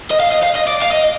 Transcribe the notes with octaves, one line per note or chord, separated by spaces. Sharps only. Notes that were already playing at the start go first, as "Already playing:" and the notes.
D#5
F5
D#5
F5
D#5
D5
F5
D#5